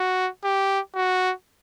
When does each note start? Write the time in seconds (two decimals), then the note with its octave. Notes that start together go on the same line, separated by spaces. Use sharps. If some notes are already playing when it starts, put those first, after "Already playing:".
Already playing: F#4
0.44 G4
0.95 F#4